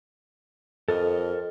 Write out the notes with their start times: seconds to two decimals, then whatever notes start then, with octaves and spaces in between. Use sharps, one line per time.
0.88 F2 A4 A#4 D#5